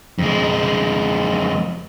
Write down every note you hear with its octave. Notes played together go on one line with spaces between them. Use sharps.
F2 G#3